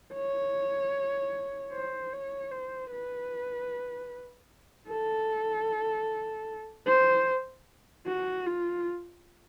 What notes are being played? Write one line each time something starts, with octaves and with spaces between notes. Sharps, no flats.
C#5
C5
C#5
C5
B4
A4
C5
F#4
F4